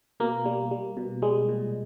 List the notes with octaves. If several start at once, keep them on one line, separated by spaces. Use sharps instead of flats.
B2 A#3
G3
G3
B2
G3 G#3
A#2